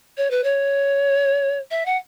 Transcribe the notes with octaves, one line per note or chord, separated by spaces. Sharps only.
C#5
B4
C#5
E5
F#5